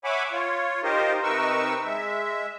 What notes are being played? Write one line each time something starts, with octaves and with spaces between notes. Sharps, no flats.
C#5 E5 F#5 G#5 B5 D6
F4 C#5
D#4 F4 G4 A#4 C5 D#5
C3 D#4 A#4 B4 C#6 E6
G#3 E5